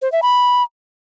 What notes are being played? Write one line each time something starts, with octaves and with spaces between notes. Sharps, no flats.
C5
E5
B5